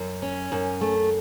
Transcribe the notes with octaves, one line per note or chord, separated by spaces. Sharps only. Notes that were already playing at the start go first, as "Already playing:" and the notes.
Already playing: F#2
C#4
F#2
A3